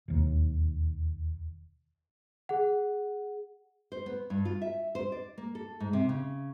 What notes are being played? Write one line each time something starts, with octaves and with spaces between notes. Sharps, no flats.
E1 D#2
G#4 F#5
C5
B3
G2
F4
E5
C5
D5
A#3
A4
G#2
C3
C#3